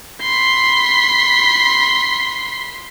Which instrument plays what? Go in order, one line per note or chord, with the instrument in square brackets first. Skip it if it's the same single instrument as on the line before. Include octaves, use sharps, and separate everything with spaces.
[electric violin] B5 C6